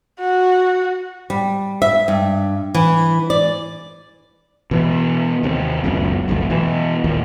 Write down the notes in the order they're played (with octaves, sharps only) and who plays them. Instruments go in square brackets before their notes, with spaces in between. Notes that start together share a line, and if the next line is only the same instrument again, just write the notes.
[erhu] F#4
[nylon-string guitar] G3
E5
G2
E3
D5
[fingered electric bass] B2 E3 B3
D#2 C3
F#1 C#2 F#2 B2
F#1 B1 F2 A2
B2 E3
D#2 A#2